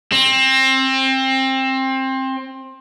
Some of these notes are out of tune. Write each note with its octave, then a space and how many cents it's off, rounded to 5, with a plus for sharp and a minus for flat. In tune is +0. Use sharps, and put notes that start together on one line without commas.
C4 +20